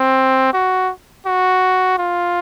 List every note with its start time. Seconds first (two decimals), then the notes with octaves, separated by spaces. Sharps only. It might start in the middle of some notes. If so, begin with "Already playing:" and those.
Already playing: C4
0.53 F#4
1.26 F#4
1.98 F4